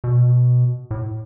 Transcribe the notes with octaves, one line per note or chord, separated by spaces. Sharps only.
B2
A2